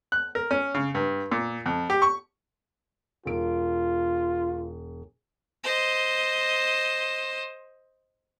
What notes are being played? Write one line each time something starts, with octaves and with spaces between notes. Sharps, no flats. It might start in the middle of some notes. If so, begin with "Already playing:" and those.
F#6
A#4
C#4
C#3
G2
A#2
F2
G4
C#6
E1 F4 D7
C5 D#5